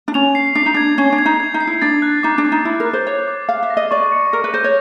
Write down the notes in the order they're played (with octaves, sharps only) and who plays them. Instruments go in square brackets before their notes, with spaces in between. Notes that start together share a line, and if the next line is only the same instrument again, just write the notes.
[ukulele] D4
[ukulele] C#4 [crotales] F7
[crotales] C7
[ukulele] D4 [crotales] C7
[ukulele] D#4
[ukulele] D4 [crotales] G#6
[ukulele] C#4 [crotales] G#6
[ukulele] D4
[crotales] G#6
[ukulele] D#4
[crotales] G#6
[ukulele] D#4
[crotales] C7
[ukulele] E4
[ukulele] D4 [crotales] A6
[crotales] F#6
[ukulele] D#4 [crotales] D6
[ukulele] D4
[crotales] D6
[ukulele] D#4
[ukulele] E4 [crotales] D6
[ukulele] A#4
[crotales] F#6
[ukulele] C5
[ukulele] C#5 [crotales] D6
[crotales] D6
[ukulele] F5 [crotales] F6
[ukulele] E5
[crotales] A#6
[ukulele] D#5
[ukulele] D5 [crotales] C#6
[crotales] C#7
[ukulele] A#4 [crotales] A#6
[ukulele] B4
[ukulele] C5 [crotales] A#6
[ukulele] C#5